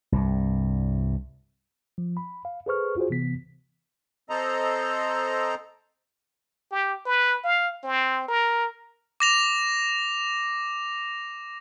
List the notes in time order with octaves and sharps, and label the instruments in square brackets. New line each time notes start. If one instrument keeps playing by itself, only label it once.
[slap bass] C2 G2
[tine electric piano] F3
B5
F5
G#4 A4 B4 C5 C#6 F6
F4 F#4 G#4 C5
C3 E3 B3 B6
[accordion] C4 A4 C5 D#5 A#5
[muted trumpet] G4
B4
F5
C4
A#4
[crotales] D6 A#6 F7